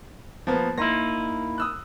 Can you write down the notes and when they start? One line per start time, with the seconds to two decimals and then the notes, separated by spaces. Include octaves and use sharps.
0.47 F3 A#3 B3
0.78 A#3 D#4 E4 C6 A#6
1.58 D#6 E6 F#6